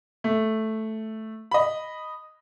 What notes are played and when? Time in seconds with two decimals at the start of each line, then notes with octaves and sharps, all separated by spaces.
0.24 A3
1.51 D#5 B5